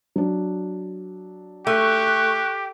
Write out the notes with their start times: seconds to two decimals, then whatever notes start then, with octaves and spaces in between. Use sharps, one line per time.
0.16 F#3 D4
1.67 A3 G4 C#6 F#6